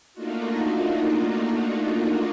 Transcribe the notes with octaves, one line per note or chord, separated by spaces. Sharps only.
A3 A#3 D4 D#4 F4 F#4